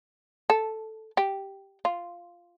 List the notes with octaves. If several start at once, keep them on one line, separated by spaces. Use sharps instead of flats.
A4
G4
F4